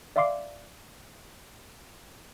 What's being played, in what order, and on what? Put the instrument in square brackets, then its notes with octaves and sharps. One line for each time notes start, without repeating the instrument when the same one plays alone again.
[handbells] D5 E5 F5 C6 D6 C7